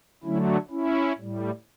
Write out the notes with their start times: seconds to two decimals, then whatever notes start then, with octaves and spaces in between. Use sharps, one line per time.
0.23 D3 F#3 A3 C#4 E4
0.70 C#4 E4
1.18 A2 G3